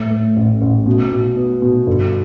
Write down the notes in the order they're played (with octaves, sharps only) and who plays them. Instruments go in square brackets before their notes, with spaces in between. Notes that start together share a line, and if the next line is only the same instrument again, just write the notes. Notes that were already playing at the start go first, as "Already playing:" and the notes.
Already playing: [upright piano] A2
A2
A1
A1
B2
B2
B3
B2
G1